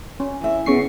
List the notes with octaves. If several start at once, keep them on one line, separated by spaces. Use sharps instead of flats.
C#4
E3 E5
C#3 B3 C#6 C7